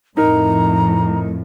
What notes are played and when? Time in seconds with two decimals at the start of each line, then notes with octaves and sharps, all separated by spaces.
0.17 F2 A2 D#4 A#4 A#5